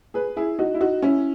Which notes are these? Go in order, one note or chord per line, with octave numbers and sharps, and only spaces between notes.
G#4 B4
E4 G#4
D#4 F#4
E4
D#4 F#4
C#4 E4